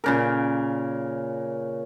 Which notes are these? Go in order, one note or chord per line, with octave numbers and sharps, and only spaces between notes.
A#2 C#3 A#4